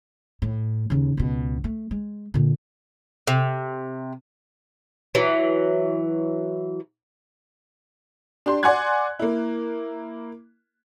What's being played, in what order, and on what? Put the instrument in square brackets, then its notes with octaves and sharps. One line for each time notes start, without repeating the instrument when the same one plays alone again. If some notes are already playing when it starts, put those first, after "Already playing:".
[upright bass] A2
D#2 C#3
C#2 B2
A3
G#3
A#2 D3
[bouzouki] C3
E3 F#3
[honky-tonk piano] D4 G4 C6
D5 F#5 G#5 C6 F#6 G#6
A#3 E4